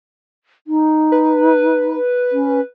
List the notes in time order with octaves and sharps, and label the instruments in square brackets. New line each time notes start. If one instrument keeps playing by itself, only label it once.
[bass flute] D#4
[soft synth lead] B4
[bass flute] C#4